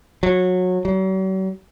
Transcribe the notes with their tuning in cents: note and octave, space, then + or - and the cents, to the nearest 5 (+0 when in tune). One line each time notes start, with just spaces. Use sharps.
F#3 -20
F#3 +45